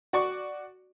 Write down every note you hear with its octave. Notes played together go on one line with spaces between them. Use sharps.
F#4 D5 C#6